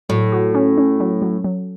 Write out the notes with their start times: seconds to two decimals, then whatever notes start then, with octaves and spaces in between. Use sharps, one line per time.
0.09 A2 F#3
0.32 F#4
0.54 C#4
0.78 C#4
1.00 F#3
1.22 F#3
1.44 F#3